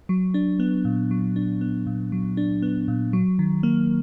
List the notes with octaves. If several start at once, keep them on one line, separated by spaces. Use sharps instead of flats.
F#3
D4
B3
A#2
F#3
D4
B3
A#2
F#3
D4
B3
A#2
F#3
D#3
A#3